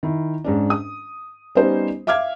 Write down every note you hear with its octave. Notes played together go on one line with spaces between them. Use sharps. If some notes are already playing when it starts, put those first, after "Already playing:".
D#3 E4
G#2 C#4 D4
D#6
G3 B3 C#4 D#4 C5
E5 F5 D6 F6 G#6